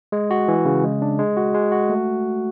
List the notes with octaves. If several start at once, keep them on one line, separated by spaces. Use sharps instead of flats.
G#3
F#4
E3
C#3
G#3
D4
G#3
F#4
G#3
F#4
A3